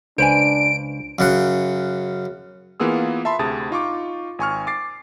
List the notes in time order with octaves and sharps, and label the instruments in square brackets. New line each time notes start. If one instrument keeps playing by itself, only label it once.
[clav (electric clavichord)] C#2 B4 [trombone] D4 [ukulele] C5 G#5 [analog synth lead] D7
[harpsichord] F#2 C#3 F#5
[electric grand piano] E3 A#3 B3 F4 G#4 E6
E5 A5 B5 C6
D2 C3 G#4 A5 D#6 A6
D#4 F4 C#6 D6
G#1 G#5 C#6 F6
D6 A6 C7